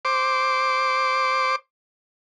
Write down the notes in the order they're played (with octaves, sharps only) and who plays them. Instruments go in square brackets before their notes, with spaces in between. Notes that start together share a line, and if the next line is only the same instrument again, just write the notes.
[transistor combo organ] C5 D6